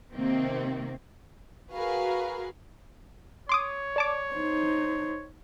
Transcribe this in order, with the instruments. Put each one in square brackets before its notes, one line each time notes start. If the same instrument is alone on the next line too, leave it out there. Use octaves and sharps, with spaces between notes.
[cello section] C3 D#3 A#3 C4
[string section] F#4 G#4 A#4 B4 F5
[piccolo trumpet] C#5 [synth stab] C6 D6 D#6
[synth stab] D5 A5 D6
[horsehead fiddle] D#4 C5